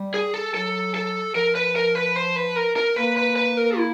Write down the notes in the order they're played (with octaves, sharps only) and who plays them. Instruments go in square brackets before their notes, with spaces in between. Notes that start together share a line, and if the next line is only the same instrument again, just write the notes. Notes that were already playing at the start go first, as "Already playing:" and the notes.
Already playing: [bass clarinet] G3
[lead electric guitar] G#4
A4
[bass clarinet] F#3 [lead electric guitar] A4
[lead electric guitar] A4
[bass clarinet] F3 [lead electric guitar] A#4
[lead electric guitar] B4
A#4
B4
C5
B4
A#4
A#4
[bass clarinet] A#3 [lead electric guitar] B4
[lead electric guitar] B4
B4
A#4
E4